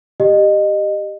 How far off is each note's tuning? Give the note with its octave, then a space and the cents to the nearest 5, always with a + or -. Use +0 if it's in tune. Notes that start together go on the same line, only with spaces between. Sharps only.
G4 +0 D#5 -20